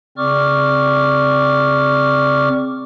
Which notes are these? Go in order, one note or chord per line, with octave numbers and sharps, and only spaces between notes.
C#3 C4 D5 C#6 D6 F6